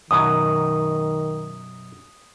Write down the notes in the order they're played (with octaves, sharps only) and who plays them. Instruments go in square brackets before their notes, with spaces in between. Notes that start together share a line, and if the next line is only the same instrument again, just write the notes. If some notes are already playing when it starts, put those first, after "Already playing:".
[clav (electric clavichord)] F#2 B2 F#3 [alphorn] D#3 [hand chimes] D#6